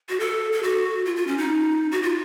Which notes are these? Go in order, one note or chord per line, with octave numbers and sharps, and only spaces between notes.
F#4
A4
A4
F#4
F4
F4
C#4
D#4
F#4
F4